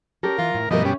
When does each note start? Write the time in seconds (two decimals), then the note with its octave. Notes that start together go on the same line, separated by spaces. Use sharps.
0.23 C#4 G4 A4 A#4
0.38 E3 F4
0.54 A2
0.71 G2 B2 F3 A3 A#4 D#5
0.85 C#4 G4